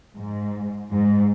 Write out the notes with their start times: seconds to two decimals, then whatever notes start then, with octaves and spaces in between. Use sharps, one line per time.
0.16 G#2
0.91 G#2